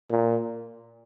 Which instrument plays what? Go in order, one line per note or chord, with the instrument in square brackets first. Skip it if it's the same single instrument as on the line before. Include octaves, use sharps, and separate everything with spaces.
[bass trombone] A#2